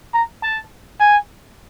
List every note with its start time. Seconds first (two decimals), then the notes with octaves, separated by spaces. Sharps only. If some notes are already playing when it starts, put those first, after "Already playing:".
0.14 A#5
0.43 A5
1.00 G#5